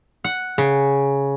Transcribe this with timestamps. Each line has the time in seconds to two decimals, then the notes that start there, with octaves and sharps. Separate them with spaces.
0.24 F#5
0.58 C#3